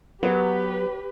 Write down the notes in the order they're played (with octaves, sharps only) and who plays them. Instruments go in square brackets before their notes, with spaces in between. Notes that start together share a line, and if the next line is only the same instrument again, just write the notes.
[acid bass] F#3 [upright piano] B3 [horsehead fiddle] G4 B4